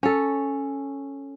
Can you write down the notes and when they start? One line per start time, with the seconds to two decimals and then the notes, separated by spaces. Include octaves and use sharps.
0.03 C#4 A4